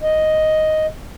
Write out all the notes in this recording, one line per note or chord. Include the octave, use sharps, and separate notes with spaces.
D#5